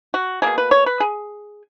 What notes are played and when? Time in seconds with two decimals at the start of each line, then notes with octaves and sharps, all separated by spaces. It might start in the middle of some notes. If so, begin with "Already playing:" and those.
0.14 F#4
0.42 F#3 A#3 G#4
0.47 B2
0.58 B4
0.71 C#5
0.86 B4
1.00 G#4